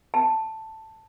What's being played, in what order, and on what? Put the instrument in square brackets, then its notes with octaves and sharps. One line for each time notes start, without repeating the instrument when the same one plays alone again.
[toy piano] A5